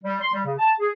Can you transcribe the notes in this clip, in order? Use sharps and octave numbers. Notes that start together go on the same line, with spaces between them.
G3
C6
G3
C#3
A5
G#4